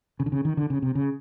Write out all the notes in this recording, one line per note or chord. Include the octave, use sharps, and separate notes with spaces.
C#3
D3
C#3
D#3
D3
C#3
C3
C#3